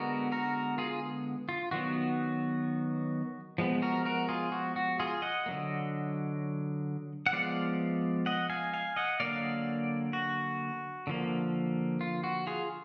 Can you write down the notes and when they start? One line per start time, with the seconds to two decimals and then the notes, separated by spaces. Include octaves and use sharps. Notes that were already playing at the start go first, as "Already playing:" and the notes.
Already playing: D3 G#3 B3 F#4 A#4
0.32 F#4 A#4
0.78 F4 G#4
1.49 F4
1.71 D#3 F#3 B3 F#4
3.58 F3 G#3 B3
3.82 F#4 A#4
4.05 F#4 A#4
4.29 F4 G#4
4.52 F#4
4.76 F#4
5.00 F4 G#4
5.22 D#5 F#5
5.46 D3 F#3 A#3
7.26 F#5
7.33 F3 G#3 B3 D5 F5
8.26 D#5 F#5
8.50 F5 G#5
8.74 F5 G#5
8.96 D#5 F#5
9.20 D3 F#3 A#3 D5 F5
10.13 F#4
11.07 D3 F3 A#3
12.01 F4
12.24 F#4
12.47 F4 G#4